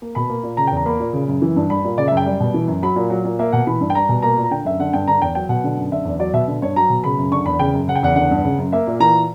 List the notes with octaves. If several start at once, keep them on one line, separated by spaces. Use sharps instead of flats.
A#3
B2 B5
A#3
A#2
C#3 A#5
G5
E2
A#5
A#3 B5
A#2
C#3
F#2
E3
G2
G3 B5
A#2
C#3 D5
E5
F#2 G5
G3
B2
E3
F#2
F#3 B5
A#2
F#3
A#2
A#3 E5
B2 F#5
E3 B5
G2
G5
G3 A#5
B2
A#3 A#5
A#2
A#5
D3 G5
F#2 E5
D3 F#5
G2 G5
D3 A#5
E2 G5
F#3 G5
B2 F#5
D3
F#2
D3 E5
E2
F#3 D5
B2 E5
D3
G2 C#5
F#3 A#5
B2
C#3 B5
F#2
D3 C#6
E2 B5
C#3 G5
F#2
C#3 F#5
G5
E2 F#5
D3 F#5
G2
C#3
F#2
A#3 E5
A#2
E3 A#5